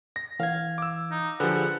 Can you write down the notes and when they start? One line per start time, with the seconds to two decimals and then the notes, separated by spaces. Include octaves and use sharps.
0.16 A#6
0.40 E3 F5 G#6
0.78 D6 E6
1.11 D#4
1.40 D3 F3 G4 G#4 B4 F#5